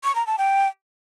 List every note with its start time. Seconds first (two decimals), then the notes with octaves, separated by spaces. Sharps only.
0.04 C#6
0.15 A#5
0.27 A5
0.38 G5